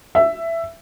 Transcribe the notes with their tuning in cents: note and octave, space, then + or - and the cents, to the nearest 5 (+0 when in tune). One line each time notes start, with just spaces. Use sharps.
E5 +10